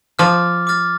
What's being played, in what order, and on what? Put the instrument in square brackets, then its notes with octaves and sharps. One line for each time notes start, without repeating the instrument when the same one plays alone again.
[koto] F3 [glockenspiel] D6 F6 A6
[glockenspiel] D6 F6 A6